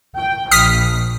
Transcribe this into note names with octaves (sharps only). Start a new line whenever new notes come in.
G5
A#1 D#6 F6 B6